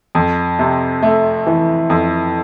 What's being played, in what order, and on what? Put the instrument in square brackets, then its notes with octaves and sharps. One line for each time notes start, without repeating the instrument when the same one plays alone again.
[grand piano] F2
C3
A3
E3
F2